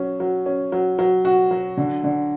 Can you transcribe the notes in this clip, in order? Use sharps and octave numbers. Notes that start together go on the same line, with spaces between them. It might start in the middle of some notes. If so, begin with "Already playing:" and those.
Already playing: F#3 C#4
F#3
C#4
F#3
F#3
F#4
F#3
D3
D3